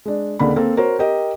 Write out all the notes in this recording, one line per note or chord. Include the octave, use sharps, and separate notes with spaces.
G#3 D4
C#2 D3 A#3 D4 B5
A#3 C4 A4
F#4 A#4 C5 C#5
G4 A#4 D#5 G5